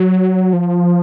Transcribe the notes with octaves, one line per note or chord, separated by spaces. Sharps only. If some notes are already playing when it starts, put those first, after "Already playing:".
Already playing: F#3
F3